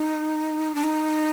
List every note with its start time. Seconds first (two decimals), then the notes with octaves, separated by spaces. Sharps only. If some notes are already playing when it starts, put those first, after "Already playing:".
Already playing: D#4
0.75 D4
0.84 D#4